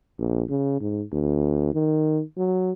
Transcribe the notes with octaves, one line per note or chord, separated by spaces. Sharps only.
A#1
C#3
G#2
D2
D#3
F#3